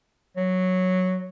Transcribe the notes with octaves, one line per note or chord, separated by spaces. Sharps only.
F#3